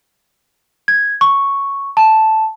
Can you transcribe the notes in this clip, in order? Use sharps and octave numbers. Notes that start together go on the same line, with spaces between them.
G#6
C#6
A5